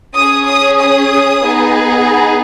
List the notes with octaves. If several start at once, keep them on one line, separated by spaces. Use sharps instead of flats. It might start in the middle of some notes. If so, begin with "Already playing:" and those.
C#4 G#4 D#6
D#6
D#6
B3 D#4 G#4